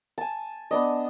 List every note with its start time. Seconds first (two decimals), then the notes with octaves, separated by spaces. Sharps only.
0.18 G#5 A5
0.71 B3 D4 D#5